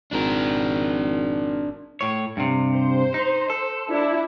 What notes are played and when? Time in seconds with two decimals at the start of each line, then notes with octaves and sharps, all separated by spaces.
0.13 G#1 D4 A#4
2.01 A2 C#5
2.37 G2 C3
2.74 C5
3.14 D#4
3.50 A4
3.89 D4 E4